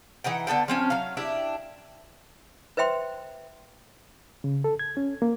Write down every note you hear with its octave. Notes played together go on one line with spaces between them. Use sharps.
E3 D#4 F#5 G5
D3 B3 A4 G5
F3 C4 C#4
F#3 F5
D4 E4 G4
B4 C5 E5 G5 C6
C#3
A4
G#6
C#4
A#3